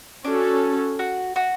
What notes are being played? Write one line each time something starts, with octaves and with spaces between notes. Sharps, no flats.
C#4 D4 F#4 A4
F#4
F#4